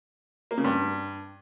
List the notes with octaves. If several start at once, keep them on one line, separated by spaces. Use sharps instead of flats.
A#3
C#3
G2